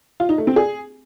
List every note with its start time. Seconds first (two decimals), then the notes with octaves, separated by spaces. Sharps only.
0.20 F4
0.29 D#4
0.38 A3
0.47 C4
0.56 G#4